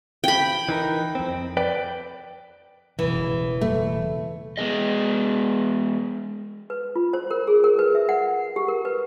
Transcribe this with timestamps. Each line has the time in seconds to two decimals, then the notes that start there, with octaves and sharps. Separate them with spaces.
0.24 G5 B5
0.69 E3 D#4 A#4
1.15 F2 C4
1.57 B4 D5 G5
2.99 E1 C#3 E3
3.61 A3
4.57 G#3 B3 G#4 D#5
6.70 B4
6.96 F4
7.13 C5
7.31 A#4
7.47 G#4
7.64 A#4
7.79 B4
7.95 E5
8.09 F#5
8.56 G4
8.68 A#4
8.85 B4